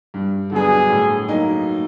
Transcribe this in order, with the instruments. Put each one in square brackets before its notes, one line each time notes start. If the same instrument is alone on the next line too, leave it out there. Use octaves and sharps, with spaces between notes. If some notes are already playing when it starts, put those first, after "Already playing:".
[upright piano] G2
[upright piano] D3 F#3 B3 D4 [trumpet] G#4
[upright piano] A2
F#3 A#3 D#4